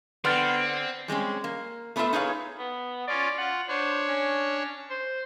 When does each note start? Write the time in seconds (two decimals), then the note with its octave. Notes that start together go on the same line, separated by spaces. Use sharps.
0.25 D3 B3 C4 C6 F6 A6
1.08 G3 G#3 C4 C#4
1.44 A#3
1.96 A3 B3 D4 F4 A4 E5
2.13 D#4 G#4 B4 C#5 F5
2.58 B3
3.07 C#4 F4 D5
3.38 F4 F#5
3.68 D4 C5 C#5
4.08 C#4
4.90 C5